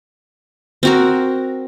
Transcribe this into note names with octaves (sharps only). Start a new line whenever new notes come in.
C4 F#4 A#4